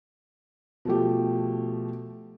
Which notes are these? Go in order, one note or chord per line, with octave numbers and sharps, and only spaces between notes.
B2 F3 A3 G4